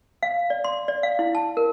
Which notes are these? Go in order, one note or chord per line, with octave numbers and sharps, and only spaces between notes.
F5
D5
C6
D5
F5
E4
A5
A#4